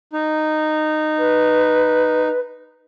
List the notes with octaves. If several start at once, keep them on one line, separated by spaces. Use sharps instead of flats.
D#4
B4